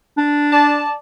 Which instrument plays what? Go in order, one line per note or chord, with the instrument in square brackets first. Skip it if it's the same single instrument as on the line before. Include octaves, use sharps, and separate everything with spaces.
[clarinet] D4
[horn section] D5 A5